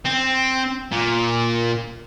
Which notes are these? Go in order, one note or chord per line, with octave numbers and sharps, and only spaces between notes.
C4
A#2